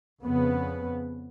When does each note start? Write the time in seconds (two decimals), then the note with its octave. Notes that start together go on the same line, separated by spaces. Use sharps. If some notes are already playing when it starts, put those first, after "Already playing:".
0.23 F2 C#3 B3